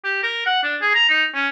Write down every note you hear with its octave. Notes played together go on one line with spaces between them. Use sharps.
G4
A#4
F#5
D4
G#4
A#5
D#4
C#4